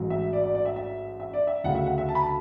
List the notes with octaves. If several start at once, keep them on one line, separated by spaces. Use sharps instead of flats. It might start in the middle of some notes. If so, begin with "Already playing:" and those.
Already playing: A1 G#2 F#3
E5
D5
D5
D5
E5
E5
E5
D5
E5
D2 C#3 F#3 F#5
E5
F#5
E5
A5
B5
A5